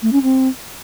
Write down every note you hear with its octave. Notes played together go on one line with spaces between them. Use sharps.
A3
C#4
C4